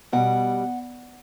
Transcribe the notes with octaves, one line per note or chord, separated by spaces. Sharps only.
B2 G3 F#5